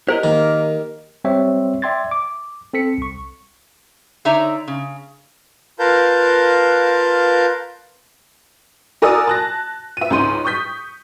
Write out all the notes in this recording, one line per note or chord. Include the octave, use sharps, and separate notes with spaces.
G4 A#4 C5 D#5 A#5
D#3 A#3
G3 C4 C5 C#5 E5
D5 E5 G5 C6 G#6 A6
D6
C4 A4 B6 C#7
C2 C#6
D3 D#4 C#5 D5 E5 A#5
C#3
F4 A#4 B4 F5 A5 G6
F#4 A#4 D5 G#5 D#6 E6
A5 F#6 A#6
E5 D#7
C#2 G#2 C#4 C6 D#7
C#6 D#6 G6 B6